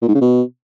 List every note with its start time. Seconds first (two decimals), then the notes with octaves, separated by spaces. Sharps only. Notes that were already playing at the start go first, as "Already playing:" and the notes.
0.02 A#2
0.08 G#2
0.15 C#3
0.21 B2